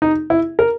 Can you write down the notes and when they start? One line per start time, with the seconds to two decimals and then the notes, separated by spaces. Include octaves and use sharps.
0.02 D#4
0.30 E4
0.59 A#4